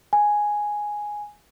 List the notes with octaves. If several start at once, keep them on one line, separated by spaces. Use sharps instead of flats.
G#5